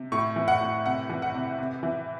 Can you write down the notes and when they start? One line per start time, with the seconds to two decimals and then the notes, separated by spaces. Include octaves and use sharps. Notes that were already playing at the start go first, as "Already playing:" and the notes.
Already playing: C3
0.12 A2 C#6
0.36 E3
0.48 F#5
0.61 A2
0.85 C3 F#5
1.09 E3
1.22 F#5
1.35 C3
1.58 C3
1.83 E3